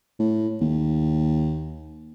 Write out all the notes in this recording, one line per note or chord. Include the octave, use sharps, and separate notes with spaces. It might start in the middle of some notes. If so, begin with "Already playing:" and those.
A2
D#2